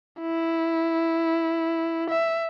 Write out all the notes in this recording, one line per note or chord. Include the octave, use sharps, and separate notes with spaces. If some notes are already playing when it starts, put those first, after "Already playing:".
E4
E5